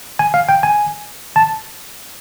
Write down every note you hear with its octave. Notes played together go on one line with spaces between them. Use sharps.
G#5
F5
G5
G#5
A5